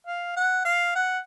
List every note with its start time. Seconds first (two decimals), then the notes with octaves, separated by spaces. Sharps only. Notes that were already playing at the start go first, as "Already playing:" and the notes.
0.07 F5
0.37 F#5
0.65 F5
0.95 F#5